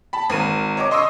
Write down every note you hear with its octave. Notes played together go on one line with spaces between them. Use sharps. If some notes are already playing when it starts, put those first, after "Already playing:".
A5 B5
G#1 A#4 D#7
C#5 D#5 D6
D#5 C6 C#6 D#6 E6